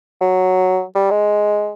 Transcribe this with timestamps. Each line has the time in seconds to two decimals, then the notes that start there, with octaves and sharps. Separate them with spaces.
0.21 F#3
0.95 G3
1.11 G#3